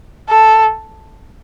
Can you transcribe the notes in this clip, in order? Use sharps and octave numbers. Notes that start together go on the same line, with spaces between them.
A4